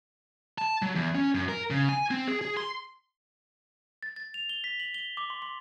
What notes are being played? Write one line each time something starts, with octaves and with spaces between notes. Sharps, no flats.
A5
F#3
E2
C#4
F#2
A#4
C#3
G#5
C4
G#4
G#4
C6
A6
A6
F7
G7
B6
F#7
G7
D6
C6
C6